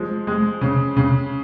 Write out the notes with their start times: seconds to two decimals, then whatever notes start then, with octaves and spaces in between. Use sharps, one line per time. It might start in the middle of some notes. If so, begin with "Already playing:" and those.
Already playing: F3 G#3
0.27 G#3
0.61 C#3
0.97 C#3